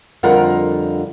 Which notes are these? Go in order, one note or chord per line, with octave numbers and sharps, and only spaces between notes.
F2 D3 G3 F4 A#4 F#5